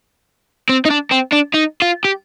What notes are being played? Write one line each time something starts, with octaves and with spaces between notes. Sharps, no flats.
C4
D#4
D4
C4
D4
D#4
F4
G4